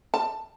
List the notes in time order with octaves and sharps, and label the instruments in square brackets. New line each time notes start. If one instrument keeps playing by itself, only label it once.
[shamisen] A5